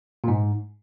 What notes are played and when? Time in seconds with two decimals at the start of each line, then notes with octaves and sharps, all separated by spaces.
0.24 A#2
0.28 G#2